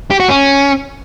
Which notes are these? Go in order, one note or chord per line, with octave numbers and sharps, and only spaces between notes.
G4
F#4
C#4